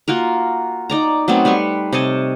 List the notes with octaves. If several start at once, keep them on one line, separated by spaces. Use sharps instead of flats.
A#3 F4 F#4 A#4
D#4 D5 A#5
F#3 A3 B3 C4
G3 B4 C6 C#6
C3 C#5 D#5 A5